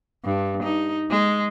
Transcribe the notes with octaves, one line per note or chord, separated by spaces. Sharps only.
G2
D#4
G#3